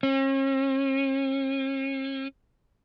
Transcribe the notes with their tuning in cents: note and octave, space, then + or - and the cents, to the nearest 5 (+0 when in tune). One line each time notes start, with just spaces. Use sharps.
C#4 -45